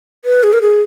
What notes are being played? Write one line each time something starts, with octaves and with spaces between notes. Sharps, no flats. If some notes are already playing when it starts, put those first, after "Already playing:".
B4
G#4
A#4
G#4